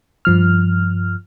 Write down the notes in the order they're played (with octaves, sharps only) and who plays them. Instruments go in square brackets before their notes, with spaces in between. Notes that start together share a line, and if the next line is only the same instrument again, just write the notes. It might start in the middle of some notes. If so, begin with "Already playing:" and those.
[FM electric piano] G2 F3 F6